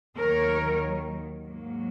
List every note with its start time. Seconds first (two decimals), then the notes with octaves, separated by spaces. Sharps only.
0.18 D#2 D#3 F#3 A#4 C#5
1.43 G#2 F#3 A#3